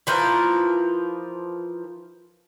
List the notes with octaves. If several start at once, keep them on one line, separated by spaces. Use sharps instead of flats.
E3 F3 F4 A#4